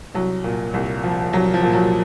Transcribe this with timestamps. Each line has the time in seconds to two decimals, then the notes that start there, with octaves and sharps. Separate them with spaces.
0.15 C2 F#3
0.44 A#2
0.74 C2
1.04 F3
1.33 C2 F#3
1.54 F3
1.63 A#2
1.73 F#3